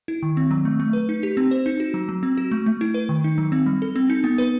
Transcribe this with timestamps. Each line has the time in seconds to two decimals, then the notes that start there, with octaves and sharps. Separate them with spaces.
0.08 E4
0.23 D#3
0.37 C4
0.51 F#3
0.65 A3
0.80 A3
0.93 B4
1.09 D#4
1.23 G4
1.37 C4
1.51 C5
1.66 D#4
1.80 F#4
1.94 F#3
2.09 F#3
2.23 C4
2.37 F#4
2.52 A3
2.66 A3
2.81 E4
2.94 B4
3.09 D#3
3.24 D#4
3.38 F#3
3.52 C4
3.66 G3
3.82 A4
3.96 C4
4.10 D#4
4.24 B3
4.38 B4